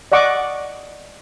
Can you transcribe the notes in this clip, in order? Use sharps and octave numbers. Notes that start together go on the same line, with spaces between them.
D5 D#5 F#5 C#6 D6